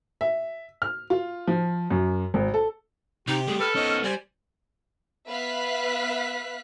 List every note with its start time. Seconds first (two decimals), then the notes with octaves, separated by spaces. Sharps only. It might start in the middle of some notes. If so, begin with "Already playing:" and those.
0.21 E5
0.82 F6
1.10 F4
1.47 F3
1.91 F#2
2.34 G#1
2.54 A4
3.28 C3 D#4 G4
3.47 G3 A3 G#4
3.60 A4 B4 F6
3.75 B3 C#4 D#4 C#5 D#5
4.04 G3 C5 D5 G#5
5.27 B3 B4 E5 F5 F#6 B6